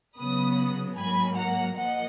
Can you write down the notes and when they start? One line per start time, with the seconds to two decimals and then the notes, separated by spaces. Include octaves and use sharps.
0.18 C#3 F#3 B3 B5 D#6
0.97 G#2 F#3 A#3 G#5 B5
1.37 F#5 A#5
1.76 A#2 F3 A#3 D#5 F#5